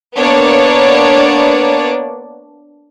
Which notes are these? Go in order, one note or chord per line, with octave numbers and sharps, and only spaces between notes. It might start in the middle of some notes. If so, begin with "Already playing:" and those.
A#3 B3 D4 C#5 D5